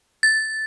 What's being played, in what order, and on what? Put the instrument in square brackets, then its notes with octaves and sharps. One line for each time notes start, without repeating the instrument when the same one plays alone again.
[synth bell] A6